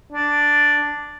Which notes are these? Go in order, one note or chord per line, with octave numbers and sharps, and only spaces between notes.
D4